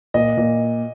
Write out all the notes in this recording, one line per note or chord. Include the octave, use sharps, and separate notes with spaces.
A#2 D#5
A#2